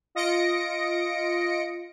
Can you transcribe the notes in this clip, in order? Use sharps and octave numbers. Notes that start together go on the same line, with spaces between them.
F4 D#5 A#6 C#7 D7